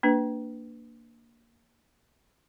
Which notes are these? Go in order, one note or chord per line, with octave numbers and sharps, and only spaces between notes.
A#3 D4 B4